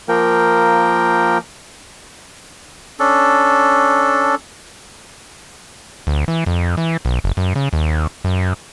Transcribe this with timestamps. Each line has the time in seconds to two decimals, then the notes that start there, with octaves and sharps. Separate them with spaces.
0.09 F3 A#3 A#4 G5
3.00 C#4 D4 A4
6.07 D2
6.28 E3
6.47 F2
6.77 E3
7.05 B1
7.24 F#1
7.37 F#2
7.56 C#3
7.73 D#2
8.24 F#2